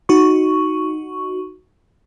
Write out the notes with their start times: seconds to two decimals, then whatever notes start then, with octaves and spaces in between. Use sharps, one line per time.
0.09 D#4 F#4 C#6